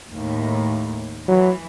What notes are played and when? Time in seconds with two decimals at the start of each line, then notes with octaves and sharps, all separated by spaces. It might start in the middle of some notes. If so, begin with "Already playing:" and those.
0.11 D#2 A2
1.28 E3 F#3